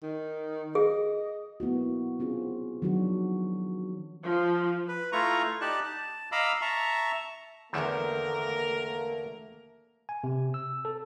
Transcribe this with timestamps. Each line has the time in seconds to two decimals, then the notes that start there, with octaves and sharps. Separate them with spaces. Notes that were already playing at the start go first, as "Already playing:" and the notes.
0.02 D#3
0.75 G#4 D#5
1.60 A#3 B3 E4 F#4
2.20 C4 C#4 F4 G#4
2.82 D#3 F3 F#3 D4 F#4
4.24 F3
4.88 B4
5.12 A3 E4 F4 A#5 C#6
5.61 D#4 G4 D5 A5 F#6
5.84 A5
6.32 D#5 F5 A#5 B5 D6 E6
6.62 E5 A5 A#5 C#6
7.73 E2 D3 D#3 A3 A#3 A#4
10.09 G#5
10.24 C3
10.54 E6
10.85 A4